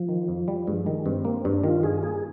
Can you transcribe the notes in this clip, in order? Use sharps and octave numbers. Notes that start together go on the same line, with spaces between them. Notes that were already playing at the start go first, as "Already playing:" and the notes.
Already playing: F3
D#3
F2
G3
G2 G#3
D#3
G2 C4
A#3
G2 D4
D#3 F4
G2 G#4
A#3 G#4